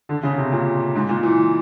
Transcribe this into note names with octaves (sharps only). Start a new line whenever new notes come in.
D3
C#3
C3
A#2
G#2
A#2
E3